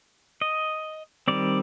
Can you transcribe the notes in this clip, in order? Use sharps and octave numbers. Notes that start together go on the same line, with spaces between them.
D#5
D#3 G3 C4 D5